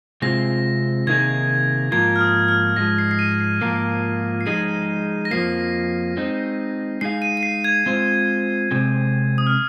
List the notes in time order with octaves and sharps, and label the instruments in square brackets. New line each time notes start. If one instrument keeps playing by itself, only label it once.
[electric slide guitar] C3 G#3 C4 F4 G#4 [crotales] A#6
[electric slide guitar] C3 D#3 A#3 D#4 G#4 [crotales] G#6
[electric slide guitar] G#2 F3 A#3 F4 A#4 [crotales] G#6
[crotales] F6
D#6
F6
[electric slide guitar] G#2 F3 G#3 [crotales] A#6
[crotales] C7
C7
D#7
C7
[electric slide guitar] G#2 F3 A#3 F4 A#4 [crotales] C7
[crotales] C7
[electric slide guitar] F3 G#3 D#4 G#4 [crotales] D#7
[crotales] A#6
[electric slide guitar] F2 F3 A#3 [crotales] C7
[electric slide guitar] G#3 C4 D#4
[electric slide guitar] G#3 D#4 G#4 F5 [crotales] C7
[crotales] D#7
D#7
C7
G#6
[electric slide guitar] G#3 C4 F4 C5
C3 G#3 C4
[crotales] D#6
F6